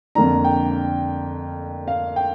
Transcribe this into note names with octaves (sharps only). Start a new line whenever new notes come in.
F2 D3 A#3 D4 A#5
G5
F5
G5